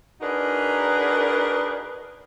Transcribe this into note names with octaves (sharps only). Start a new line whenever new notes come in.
D4 D#4 F#4 G#4 A#4 B4